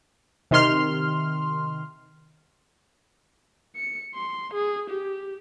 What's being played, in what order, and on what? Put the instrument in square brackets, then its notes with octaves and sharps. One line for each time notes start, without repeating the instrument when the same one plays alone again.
[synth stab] C3 D#3 C6 F6
[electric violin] C#7
C6
G#4
G4